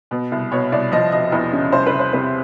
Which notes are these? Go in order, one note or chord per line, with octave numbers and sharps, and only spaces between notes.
B2
C2
B2 C#5
C2 D5
F3 D#5
E1 D#5
E2
C#3
C2 C5
B4
C2
C5
C3 B4